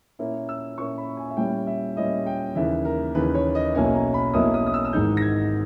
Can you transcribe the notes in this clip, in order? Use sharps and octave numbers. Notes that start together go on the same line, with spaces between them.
A#2 A#3 C#4 E4
E6
A#2 A#3 C#4 E4 C#6
B5
G#5
E5
A#2 G3 C#4 E4 G5
E5
A#2 G3 C#4 E4 D#5
G5
D#2 C#3 E3 E5
A#4
D#2 C#3 E3 B4
C#5
D#5
B1 B2 A#3 C#4 E4 G#5
A#5
B5
B1 B2 A#3 C#4 E4 D#6
D#6
D#6
E6
E6
G#1 G#2 E3 G#3 D#4 G6
A#6
G#6